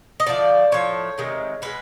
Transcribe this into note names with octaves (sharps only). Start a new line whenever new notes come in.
D#5
D3 F3 A3 D5
A2 F3 A3 C#5
C3 D#3 G#3
B2 G#3 B4